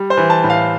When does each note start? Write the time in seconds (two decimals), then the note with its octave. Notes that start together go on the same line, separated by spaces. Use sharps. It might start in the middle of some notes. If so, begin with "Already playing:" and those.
Already playing: G3
0.10 C5
0.17 E3
0.30 A5
0.44 A2
0.50 F5